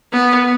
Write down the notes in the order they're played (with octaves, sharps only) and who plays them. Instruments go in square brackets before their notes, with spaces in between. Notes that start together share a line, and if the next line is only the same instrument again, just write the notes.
[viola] B3